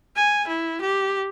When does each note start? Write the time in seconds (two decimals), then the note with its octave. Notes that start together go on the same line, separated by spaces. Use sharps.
0.16 G#5
0.47 E4
0.81 G4